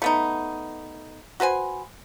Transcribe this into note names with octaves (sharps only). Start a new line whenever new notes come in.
A3 B3 D#4
F#4 B4 C5 G#5